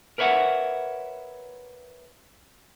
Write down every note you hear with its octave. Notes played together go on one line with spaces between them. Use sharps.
A#4 B4 C#5 E5 F#5